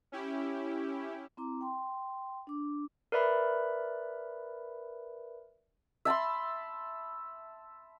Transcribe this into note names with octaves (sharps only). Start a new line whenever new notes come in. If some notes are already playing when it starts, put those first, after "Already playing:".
C#4 E4 G4
C4 E4 A#5 D6
G5 C6
D4 D6
A#4 B4 D5 E5 B5
E5 A5 B5 C6